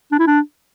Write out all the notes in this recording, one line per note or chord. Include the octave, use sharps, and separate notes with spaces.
D4
E4
D4